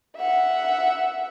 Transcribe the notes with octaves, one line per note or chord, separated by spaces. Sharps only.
E5 F#5